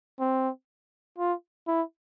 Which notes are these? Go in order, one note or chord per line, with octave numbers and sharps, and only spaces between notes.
C4
F4
E4